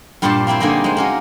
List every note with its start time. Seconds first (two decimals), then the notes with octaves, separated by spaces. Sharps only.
0.22 G2 A#2 F4 G4 C5 A5
0.47 A#3 C4 E4 C5
0.60 D3 A#3 D#4 G#4 D#5 G5
0.84 G#3 C5
0.97 A#3 C#4 F#4